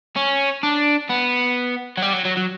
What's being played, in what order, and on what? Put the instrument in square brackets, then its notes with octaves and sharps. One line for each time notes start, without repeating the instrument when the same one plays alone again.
[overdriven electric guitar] C#4
D4
B3
F#3
G3
F#3
F#3
F#3